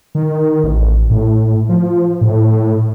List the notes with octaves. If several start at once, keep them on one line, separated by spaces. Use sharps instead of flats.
D#3
A1
A2
F3
A2